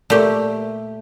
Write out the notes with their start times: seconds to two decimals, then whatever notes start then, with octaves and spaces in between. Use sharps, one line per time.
0.10 A#2 A3 G4